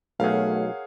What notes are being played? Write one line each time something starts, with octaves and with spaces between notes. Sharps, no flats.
B1 A3 G#4 A#4 C#5 F5 F#5